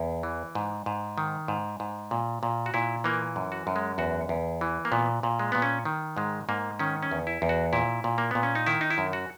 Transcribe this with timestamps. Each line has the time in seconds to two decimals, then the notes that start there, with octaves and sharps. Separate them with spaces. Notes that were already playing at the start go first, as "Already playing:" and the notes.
Already playing: E2
0.23 E3
0.55 G#2
0.86 G#2
1.18 D#3
1.48 G#2
1.80 G#2
2.11 A#2
2.43 A#2
2.66 F#4
2.74 A#2 E4
3.04 E3 A#3
3.36 F#2
3.52 F#4
3.67 F#2
3.76 G#3
3.98 E2 F#4
4.29 E2
4.61 E3
4.85 A#3
4.92 A#2 B3
5.23 A#2
5.39 G#3
5.52 A#2 B3
5.62 C#4
5.85 D#3
6.17 G#2 G#3
6.49 G#2 A#3
6.79 D#3 C#4
7.03 C#4
7.11 E2
7.27 E4
7.42 E2
7.49 F#4
7.73 A#2 E4
8.04 A#2
8.18 A#3
8.31 A#2 B3
8.43 C#4
8.55 D#4
8.66 D#3 E4
8.81 D#4
8.90 E4
8.98 F#2
9.13 F#4